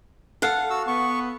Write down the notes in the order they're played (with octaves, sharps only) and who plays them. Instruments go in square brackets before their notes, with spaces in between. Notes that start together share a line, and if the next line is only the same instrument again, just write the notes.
[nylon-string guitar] A4 [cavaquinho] F5 F#5
[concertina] F#4 E6
[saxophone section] B3 [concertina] C#6